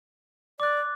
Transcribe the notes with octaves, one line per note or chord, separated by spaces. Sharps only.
D5 D6 F#6